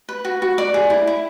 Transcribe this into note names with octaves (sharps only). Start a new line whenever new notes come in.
B4
F#4
F#4
D5
G#4
E4
E4